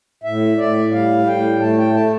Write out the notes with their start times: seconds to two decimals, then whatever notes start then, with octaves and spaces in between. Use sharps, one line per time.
0.24 A2 E5
0.57 A2 D5
0.91 G3 F5
1.26 A2 G5
1.60 A3 A5
1.78 G5
1.94 A3 A5